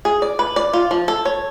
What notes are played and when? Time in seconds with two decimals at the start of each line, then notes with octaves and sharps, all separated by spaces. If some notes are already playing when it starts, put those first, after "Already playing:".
0.05 G#4
0.22 D5
0.39 B4
0.56 D5
0.73 F4
0.91 F3
1.08 A4
1.25 C#5